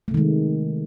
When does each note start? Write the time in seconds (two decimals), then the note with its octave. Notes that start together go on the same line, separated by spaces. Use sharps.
0.08 A3
0.11 C3
0.14 D#3
0.17 G#3